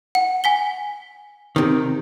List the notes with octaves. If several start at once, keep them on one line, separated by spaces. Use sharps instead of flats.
F#5
G#5 B6 G7
C3 D#3